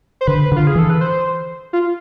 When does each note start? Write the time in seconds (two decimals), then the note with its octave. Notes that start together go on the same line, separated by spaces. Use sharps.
0.21 C5
0.27 D3 B4
0.52 D3 F4
0.67 G#4
0.76 E3 A4
0.90 B4
1.01 C5
1.73 F4